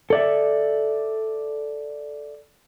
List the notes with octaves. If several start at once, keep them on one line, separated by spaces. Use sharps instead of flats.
A4 D5 E5